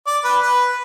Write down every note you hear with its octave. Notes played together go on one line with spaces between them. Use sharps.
D5
B4
B4